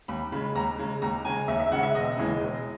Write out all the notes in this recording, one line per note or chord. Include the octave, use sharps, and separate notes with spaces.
D#2 B5
C#3 G#3 B5
D#2 A#5
C#3 G#3
D#2 A#5
C#3 G#3 G#5
D#2 E5
E5
C#3 G#3 F#5
E5
E1 D#5
D#2 C#3 E3 G#3
E1